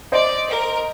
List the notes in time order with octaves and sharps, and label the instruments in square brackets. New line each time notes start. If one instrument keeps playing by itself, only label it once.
[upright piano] C5 D#5 [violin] D5
[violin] A#4